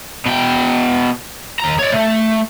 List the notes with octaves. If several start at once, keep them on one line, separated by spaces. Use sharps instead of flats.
B2 G5
D#2 A#5
C#5 D5
A3